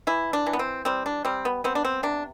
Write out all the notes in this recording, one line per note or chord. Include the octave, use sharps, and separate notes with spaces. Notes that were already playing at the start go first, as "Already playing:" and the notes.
E3 E4
D4
E3
B3
C4
G3 C4
D4
G3 C4
B3
B3 C4
D4
C4
C3 D4